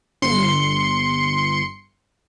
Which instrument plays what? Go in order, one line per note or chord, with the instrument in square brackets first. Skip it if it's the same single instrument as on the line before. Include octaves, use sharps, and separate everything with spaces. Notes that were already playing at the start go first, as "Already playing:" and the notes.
[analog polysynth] G1 C6 C#7